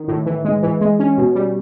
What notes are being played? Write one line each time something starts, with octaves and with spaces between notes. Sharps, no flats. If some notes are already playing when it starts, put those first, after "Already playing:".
Already playing: D#3
A2
E3
G#3
E3
G#3
C#4
B2
G3